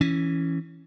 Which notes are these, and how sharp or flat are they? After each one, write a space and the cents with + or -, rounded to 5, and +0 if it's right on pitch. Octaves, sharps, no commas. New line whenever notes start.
E3 +0 C#4 +0